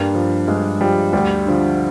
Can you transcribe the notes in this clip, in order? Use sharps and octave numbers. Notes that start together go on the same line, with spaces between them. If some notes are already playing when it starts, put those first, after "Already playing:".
Already playing: G2 G3 A#3
F3
G2 G#3
F3 G3
D2 G3
D3 F3